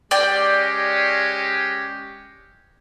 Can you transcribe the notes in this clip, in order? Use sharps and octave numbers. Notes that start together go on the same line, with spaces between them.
G#3 C#4 G4 D5 G5